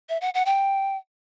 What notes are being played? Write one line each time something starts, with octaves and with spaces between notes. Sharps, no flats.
E5
F#5
F#5
G5